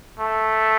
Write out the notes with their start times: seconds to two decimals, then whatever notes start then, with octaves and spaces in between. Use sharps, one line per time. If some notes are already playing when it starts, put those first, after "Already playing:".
0.19 A3